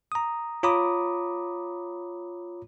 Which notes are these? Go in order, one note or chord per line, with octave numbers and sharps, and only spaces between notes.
A#5 D#6
F4 C#5 A#5 B5 D6 D#6